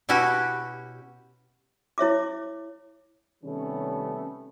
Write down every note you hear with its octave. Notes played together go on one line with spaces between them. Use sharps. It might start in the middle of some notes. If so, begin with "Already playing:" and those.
B2 C#4 E4 F#4 G4
E4 C#5 E5 D6
C3 D#3 G3 A3 B3 C#4